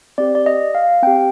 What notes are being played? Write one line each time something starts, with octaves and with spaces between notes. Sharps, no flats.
C4 G4 D5
D5
D#5
F5
C4 G4 G5